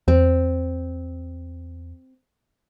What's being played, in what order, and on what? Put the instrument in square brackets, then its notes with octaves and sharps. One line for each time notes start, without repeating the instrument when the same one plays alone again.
[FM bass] E2 [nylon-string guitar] C4